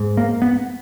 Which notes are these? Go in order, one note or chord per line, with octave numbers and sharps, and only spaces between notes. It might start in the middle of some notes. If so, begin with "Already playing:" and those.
Already playing: G#2
A#3
B3